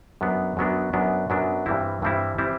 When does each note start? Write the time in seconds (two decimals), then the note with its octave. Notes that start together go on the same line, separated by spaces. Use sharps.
0.21 F#2 F#3 B3 D4
0.57 F#2 F#3 B3 D4
0.93 F#2 F#3 B3 D4
1.30 F#2 F#3 B3 D4
1.66 G2 E3 G3 C4 E4
2.02 G2 E3 G3 C4 E4
2.38 E3 G3 C4 E4